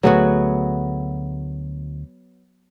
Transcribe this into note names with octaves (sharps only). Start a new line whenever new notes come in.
D2 F#3 A3 B3 F#4 G#4